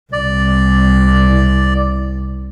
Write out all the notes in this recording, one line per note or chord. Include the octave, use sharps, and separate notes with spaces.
C2 D5